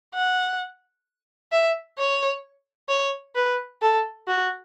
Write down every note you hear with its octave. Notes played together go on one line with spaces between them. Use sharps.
F#5
E5
C#5
C#5
B4
A4
F#4